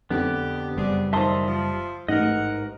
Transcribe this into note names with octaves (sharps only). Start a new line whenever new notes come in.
F2 D3 B3 G4
F#1 G3 C4 D4 G#4
E2 A#2 D#3 C5 E5 A5 C6 D#6
F3
A1 G#2 A#4 D#5 F#5